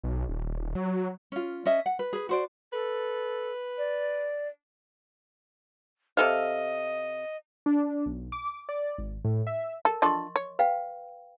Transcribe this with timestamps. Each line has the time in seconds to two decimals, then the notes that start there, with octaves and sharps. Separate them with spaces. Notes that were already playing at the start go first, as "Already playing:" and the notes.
0.03 B1
0.29 D#1
0.75 F#3
1.32 C#4 F4
1.66 C#4 D#5 E5
1.86 F#5
1.99 B4
2.13 G#4 B4
2.29 F#4 C5 D5
2.73 A4 B4
3.78 D5
6.17 C3 A4 D#5 F5
7.66 D4
8.06 B1
8.32 D6
8.69 D5
8.98 G#1
9.25 A2
9.47 E5
9.85 A4 A#4
10.02 D4 F4 A4 D#5 C6 C#6
10.36 C#5
10.59 B4 F5 G5